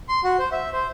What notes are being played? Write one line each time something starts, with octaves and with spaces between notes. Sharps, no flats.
C6
F#4
C5
E5
C5